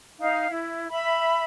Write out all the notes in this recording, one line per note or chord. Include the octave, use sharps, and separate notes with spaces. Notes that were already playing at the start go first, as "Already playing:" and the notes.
D#4 F5
E4
E5 B5